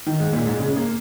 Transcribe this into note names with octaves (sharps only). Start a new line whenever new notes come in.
D#3
G#2
A#2
G#2
C#3
A#3